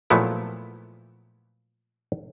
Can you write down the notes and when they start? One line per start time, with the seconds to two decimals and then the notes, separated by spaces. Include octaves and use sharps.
0.10 A#2 F3 F#3 A3 B3 E4